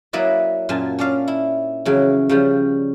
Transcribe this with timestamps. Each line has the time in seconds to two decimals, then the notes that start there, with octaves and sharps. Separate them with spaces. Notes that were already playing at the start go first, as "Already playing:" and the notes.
0.13 F#3 A#3 E4 B4 D5 D#5
0.69 F#2 A#2 F4 G#5 A5
0.99 C#4 D4 D5 F5
1.28 E4
1.85 F2 C#3 E3 F#3
2.29 C#3 F3 G3